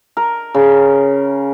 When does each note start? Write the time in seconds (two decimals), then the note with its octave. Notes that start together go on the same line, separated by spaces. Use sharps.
0.17 A#4
0.54 C#3